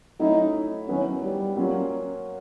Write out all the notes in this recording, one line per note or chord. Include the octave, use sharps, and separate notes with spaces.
F#3 A3 C#4 D#4 E4
D#3 F#3 B3 C#4 E4
G3
F#3 A#3 C#4 F4